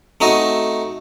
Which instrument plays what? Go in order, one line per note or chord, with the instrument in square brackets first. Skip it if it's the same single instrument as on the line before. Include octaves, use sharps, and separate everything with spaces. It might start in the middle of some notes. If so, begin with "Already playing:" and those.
[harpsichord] A3 C4 D#4 F#4 D#5